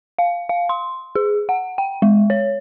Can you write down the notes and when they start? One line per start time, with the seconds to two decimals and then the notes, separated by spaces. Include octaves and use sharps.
0.18 F5
0.49 F5
0.69 C6
1.15 G#4
1.49 F#5
1.78 G5
2.02 G#3
2.30 C#5